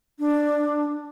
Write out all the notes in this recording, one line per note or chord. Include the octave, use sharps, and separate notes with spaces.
D4